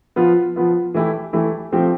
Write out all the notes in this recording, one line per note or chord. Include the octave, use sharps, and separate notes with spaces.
F3 B3 F4
F3 B3 F4
E3 A3 E4 G4
E3 A3 E4 G4
F3 A3 C4 G4